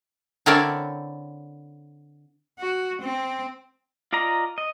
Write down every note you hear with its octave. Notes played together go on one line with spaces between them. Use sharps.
D3 C4 E4 A#4 C#5 D5
F#4
C4
F4 D5 D#5 A#5
D#5